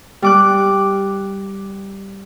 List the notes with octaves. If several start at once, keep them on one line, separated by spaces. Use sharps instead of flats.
G3 D6 F#6